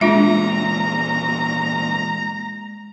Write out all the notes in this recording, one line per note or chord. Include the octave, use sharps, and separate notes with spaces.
E2 A#2 G#3 D4 F4 E5 A#5